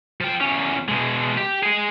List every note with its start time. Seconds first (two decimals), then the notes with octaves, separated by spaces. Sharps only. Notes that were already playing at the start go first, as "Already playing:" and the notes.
0.21 F3 G5
0.41 E2 C#4
0.88 B2 G#3
1.37 G4
1.63 G#3 G#4